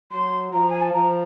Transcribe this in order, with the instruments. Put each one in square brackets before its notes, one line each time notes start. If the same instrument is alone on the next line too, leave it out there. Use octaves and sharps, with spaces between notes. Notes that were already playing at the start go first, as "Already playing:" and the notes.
[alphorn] F#3 [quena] C6
[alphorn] F3 [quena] A#5
[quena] G#5
A5
[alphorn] F3 [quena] A#5